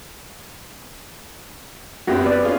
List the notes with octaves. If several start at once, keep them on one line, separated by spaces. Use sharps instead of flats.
F#2 B3 C4 F#4 G4
B4 D5
C#4 F4 G#4